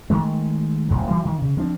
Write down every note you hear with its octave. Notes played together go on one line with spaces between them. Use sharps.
D#3 G#3 A3
D#1 A1 A2 F#3
E3 F#3 G3
D#3
C#3
F3 C4 D4